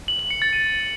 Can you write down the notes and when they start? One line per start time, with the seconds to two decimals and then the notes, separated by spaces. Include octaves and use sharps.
0.08 F#7
0.19 F#7
0.30 C#7
0.42 A6
0.53 D#7